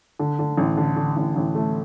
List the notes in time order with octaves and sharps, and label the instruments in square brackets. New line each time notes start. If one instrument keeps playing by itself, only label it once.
[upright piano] D3
D3
A1
D3
D3
A1
A1
A3